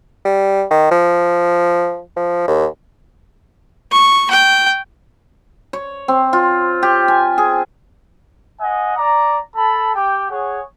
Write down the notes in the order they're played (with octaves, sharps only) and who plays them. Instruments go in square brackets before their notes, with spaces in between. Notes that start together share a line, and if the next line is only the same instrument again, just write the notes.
[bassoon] G3
D#3
F3
F3
D#2
[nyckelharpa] C#6
G5
[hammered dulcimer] C#5
C4
F4
G4
G#5
G#4
[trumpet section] D#5 F#5 G#5
D5 A#5
A4 A5 B5
G4 G5
G#4 C#5 F#5